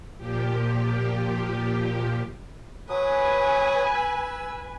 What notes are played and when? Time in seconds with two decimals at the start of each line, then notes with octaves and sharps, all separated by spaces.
0.18 A#2 F3 G4
2.89 F#3 B4 G#5 D#6
3.95 E6